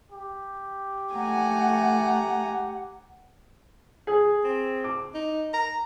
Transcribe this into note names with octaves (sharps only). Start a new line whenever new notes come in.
G4
A3 F#5 G#5 A#5
G#4
C4
D6
D#4
A#5